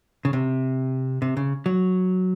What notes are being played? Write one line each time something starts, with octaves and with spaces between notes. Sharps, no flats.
C#3
C3
C3
C#3
F#3